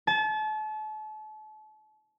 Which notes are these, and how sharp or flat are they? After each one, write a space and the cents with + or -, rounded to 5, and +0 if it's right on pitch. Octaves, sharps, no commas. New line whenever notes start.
A5 -35